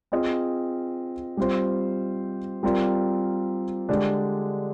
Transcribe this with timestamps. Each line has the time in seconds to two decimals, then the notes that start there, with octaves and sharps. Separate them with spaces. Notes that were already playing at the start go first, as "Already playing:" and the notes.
0.12 C4 F4 G#4 D#5
1.37 G3 C4 F4 C5
2.63 G3 C4 F4 A#4 D5
3.89 D3 G#3 D4 G4 D5